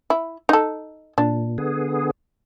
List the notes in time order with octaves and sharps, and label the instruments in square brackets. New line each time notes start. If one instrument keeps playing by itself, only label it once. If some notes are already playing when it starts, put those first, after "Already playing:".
[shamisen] E4
D#4 A4
[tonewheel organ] A#2 [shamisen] D4
[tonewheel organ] D3 B3 G#4